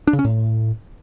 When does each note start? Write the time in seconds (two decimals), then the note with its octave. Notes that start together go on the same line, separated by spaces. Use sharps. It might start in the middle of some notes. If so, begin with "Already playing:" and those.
0.07 D4
0.13 C#3
0.19 C#4
0.25 A2